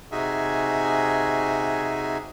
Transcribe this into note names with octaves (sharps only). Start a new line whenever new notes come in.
C3 D#4 F#4 G#4 E5 G#5